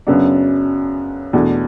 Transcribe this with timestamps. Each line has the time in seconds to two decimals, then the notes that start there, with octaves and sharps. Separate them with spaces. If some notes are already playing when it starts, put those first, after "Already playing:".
0.07 F#2 C#3 F#3 B3 D4
1.33 E2 B2 A3 D4